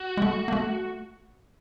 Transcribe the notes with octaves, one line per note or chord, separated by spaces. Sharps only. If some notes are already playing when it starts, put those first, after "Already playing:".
Already playing: F#4
G#3
A3
A#3
A3